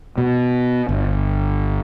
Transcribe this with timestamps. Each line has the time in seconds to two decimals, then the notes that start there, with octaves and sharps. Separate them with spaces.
0.18 B2
0.89 G1